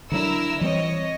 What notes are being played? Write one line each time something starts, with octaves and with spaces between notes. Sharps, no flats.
D3 F#3 D4 E4 A#4 E6
E3 G3 C4 C#5 D#5